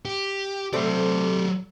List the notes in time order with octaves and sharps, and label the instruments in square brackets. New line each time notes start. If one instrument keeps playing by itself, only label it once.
[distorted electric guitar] G4
[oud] C3 A3 C4 [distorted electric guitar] F#3 D5